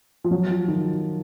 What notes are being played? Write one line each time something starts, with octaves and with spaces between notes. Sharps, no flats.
F3
F#3
F3
D#3